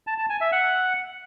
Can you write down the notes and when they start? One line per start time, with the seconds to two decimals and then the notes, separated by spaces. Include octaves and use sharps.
0.07 A5
0.18 A5
0.30 G#5
0.41 E5
0.52 F#5